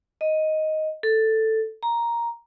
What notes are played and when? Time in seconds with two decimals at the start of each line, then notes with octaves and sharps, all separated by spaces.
0.21 D#5
1.03 A4
1.83 A#5